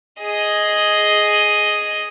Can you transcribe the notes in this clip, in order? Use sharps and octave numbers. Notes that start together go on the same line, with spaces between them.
G#4 D#5